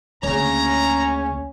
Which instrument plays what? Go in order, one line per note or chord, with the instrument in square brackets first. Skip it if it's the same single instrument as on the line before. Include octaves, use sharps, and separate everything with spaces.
[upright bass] D2 A#3 [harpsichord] C#3 C#5 [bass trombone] C#4 [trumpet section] A#5